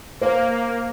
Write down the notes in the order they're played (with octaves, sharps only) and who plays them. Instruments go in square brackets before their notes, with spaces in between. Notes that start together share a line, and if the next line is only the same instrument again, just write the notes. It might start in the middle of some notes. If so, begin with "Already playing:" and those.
[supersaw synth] A#3 [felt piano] C5 F5